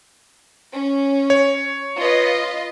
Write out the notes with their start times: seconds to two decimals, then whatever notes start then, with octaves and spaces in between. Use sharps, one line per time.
0.73 C#4
1.30 C#5
2.00 F4 B4 D#5